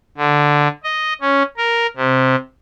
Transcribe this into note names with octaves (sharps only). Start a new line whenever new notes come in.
D3
D#5
C#4
A#4
C3